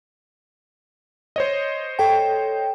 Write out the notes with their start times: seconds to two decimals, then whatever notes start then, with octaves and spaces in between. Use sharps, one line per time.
1.36 C5 C#5 D#5
1.99 A4 G5